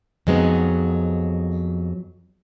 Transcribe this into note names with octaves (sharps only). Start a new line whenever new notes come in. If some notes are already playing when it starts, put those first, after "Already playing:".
F2 F#3 G#3 B3 D#4